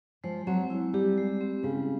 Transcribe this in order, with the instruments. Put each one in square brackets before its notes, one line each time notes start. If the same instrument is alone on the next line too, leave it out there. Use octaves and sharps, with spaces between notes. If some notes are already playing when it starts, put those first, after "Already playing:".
[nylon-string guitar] F3 [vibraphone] G#3
[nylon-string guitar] F#3 [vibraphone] C4
[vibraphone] E4
[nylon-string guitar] G3 [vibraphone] G4
[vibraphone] G#3
C4
[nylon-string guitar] C#3 [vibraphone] G3